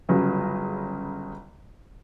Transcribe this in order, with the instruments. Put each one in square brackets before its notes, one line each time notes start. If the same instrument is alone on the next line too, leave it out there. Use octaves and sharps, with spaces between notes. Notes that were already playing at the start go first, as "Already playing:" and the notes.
[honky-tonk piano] G1 C#3 F#3